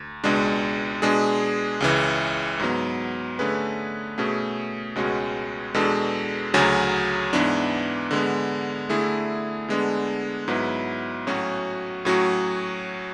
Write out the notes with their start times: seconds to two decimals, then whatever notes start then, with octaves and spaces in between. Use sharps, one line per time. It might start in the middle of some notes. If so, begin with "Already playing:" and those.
Already playing: D2
0.24 C#2 B2 G#3 D4
1.02 B2 G#3 D4 G#4
1.80 C#2 C#3 E3
2.60 G#2 F#3 B3
3.39 D3 A3 C#4 G#4 B4
4.18 B2 A3 C#4 G#4
4.96 C#2 B2 G#3 C#4 F#4
5.74 E2 B2 G#3 D4 A4
6.54 D2 C#3 F#3 C#4 G#4
7.33 G#2 E3 B3 D4
8.11 D3 G#3 B3
8.90 D3 A3 E4 G#4
9.68 D3 G#3 B3 D4
10.48 G#2 F#3 B3 E4 B4
11.27 A2 F#3 C#4 F#4
12.05 A2 F#3 C#4 F#4